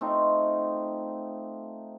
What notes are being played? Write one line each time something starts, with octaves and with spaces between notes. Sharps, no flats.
A3 C4 D#4 F4